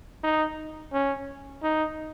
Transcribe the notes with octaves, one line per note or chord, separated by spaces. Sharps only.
D#4
C#4
D#4